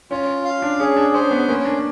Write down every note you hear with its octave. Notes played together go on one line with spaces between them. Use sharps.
C#4 F4
F5
D4
C#4 G#4
D4
C#4 C5
B3
A#3 C#4
D4